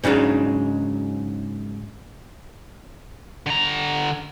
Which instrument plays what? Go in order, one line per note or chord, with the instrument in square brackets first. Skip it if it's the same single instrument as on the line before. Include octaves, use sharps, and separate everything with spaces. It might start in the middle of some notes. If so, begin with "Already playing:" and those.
[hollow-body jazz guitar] G#2 C#3 F#3 D4 D#4
[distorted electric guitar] D3 A#5